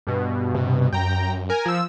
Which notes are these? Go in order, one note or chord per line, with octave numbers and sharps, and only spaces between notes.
G2 B2
C3
F#2 G5 A#5
A#4 G#5
F3 E6